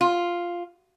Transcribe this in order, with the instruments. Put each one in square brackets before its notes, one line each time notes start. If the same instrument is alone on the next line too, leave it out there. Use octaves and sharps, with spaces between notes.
[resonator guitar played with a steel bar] F4